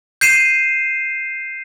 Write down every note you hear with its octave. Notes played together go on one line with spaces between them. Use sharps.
G6 C7 D#7 E7